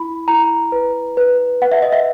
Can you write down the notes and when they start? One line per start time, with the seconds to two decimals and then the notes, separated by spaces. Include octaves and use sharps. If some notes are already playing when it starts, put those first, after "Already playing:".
Already playing: E4 B5
0.28 E4 A#5
0.72 B4
1.17 B4
1.62 B4 F#5
1.72 E5
1.82 D#5
1.93 E5